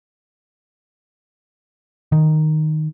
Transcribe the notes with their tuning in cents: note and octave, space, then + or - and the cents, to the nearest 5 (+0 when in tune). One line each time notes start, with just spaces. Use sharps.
D#3 -5